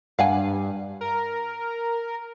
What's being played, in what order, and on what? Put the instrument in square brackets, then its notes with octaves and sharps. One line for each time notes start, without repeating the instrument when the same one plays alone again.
[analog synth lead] G2 [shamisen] F5 F#5 G#5
[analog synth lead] A#4